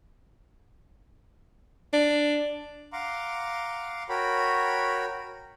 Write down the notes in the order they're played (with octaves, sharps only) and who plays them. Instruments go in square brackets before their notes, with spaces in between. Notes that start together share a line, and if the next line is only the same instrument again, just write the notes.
[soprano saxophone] D4
[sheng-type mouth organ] F5 F#5 A#5 C6 D6
F#4 A#4 C#5 G5 B5